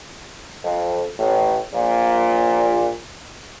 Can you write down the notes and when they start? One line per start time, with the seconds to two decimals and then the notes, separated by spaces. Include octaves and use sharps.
0.64 F2
1.19 A1 A2
1.72 A#1 A#2